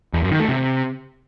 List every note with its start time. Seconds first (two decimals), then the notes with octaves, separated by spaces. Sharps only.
0.14 E2
0.22 F#2
0.31 D#3
0.40 A3
0.49 C3